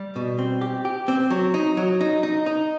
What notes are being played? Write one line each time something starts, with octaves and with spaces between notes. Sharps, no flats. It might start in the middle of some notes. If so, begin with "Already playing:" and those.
Already playing: G3
B2
C4
G4
G4
C4
F#3
D#4
F#3
D#4
D#4
D#4